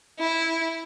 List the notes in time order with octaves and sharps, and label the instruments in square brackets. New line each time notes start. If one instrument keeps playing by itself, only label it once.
[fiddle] E4